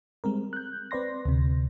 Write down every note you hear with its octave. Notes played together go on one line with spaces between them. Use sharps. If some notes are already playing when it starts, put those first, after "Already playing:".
G3 G#3 C4 A#4
F#6 G6
C4 B4 D5 C6 A#6
D2 C3